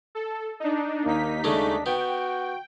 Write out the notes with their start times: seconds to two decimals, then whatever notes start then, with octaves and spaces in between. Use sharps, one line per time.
0.15 A4
0.60 D4 D#4
1.05 D#2 A#3 D#4 B6
1.44 C#3 G#3 A3 D4
1.86 B3 F#4 G5